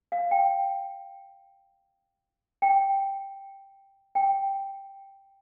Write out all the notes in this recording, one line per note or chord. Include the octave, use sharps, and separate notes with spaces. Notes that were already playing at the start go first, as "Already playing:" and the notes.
F5
G5
G5
G5